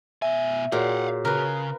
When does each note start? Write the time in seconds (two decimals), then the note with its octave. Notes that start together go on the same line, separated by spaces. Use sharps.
0.22 B2 E5 G#5
0.72 A#2 F#4 G#4 C#5 F5 F#5
1.25 C#3 A#4 B4